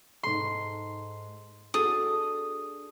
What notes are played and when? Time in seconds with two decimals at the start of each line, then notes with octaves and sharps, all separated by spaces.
0.23 G#2 A4 C6
1.74 D4 F#4 G#4 A4 D#6